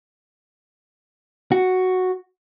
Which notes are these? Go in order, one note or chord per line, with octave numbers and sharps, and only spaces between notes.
F#4